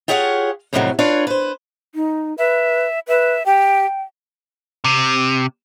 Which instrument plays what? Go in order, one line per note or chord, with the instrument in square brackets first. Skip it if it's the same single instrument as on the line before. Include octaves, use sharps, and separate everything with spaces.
[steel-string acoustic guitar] F4 G4 G#4 C#5 E5 F#5
F2 A2 C3 D#3 E3 F#3
D4 F4 B4 C#5
B4 C5
[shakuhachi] D#4
[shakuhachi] B4 [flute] E5
[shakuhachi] B4 [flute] E5
[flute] G4 [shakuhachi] G5
[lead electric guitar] C3